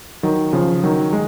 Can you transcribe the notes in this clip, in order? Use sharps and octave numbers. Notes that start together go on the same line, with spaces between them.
D#3 F#3
C#3 F3
D#3 F#3
G#3